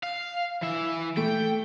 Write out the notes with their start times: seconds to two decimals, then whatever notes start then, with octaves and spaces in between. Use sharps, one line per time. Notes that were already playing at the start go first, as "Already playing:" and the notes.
0.03 F5
0.63 E3 E5
1.17 A3 G5